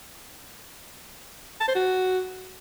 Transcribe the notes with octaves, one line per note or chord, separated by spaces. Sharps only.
A5
C5
F#4